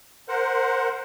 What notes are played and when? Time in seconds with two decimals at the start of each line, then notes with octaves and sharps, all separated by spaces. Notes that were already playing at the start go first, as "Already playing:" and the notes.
0.29 A#4 C5 F#5